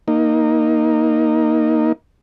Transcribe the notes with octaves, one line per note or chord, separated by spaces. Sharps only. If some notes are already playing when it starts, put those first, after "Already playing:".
A#3 D#4